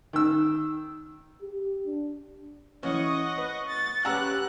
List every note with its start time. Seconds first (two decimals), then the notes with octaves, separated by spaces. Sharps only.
0.13 D#3 E6
1.42 G4
1.86 D4
2.83 E3 C#4 D#5 F#5 C#6 D#6
3.38 B4 C#6
3.68 A6
4.05 C#4 G4 B4 F#5 A#5 E6 F#6